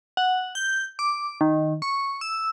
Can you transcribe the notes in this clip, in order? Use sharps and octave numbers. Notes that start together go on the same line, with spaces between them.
F#5
G6
D6
D#3
C#6
E6